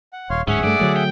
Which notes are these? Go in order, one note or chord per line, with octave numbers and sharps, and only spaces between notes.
F#5
D#1 C#5 F5 C6
D1 G#2 C#4 G#4 E5 F#5
G2 A3 D5
D3 F#3 A3
G5